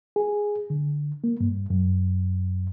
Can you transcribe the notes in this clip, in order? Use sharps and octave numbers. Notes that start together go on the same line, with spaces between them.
G#4
D3
A#3
G2
F#2